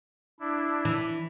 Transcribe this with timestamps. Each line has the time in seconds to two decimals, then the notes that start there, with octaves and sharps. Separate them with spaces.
0.40 D4 E4
0.85 E3